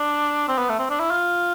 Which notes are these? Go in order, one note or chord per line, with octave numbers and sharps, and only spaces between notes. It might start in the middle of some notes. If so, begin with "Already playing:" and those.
Already playing: D4
C4
B3
A3
C4
D4
E4
F4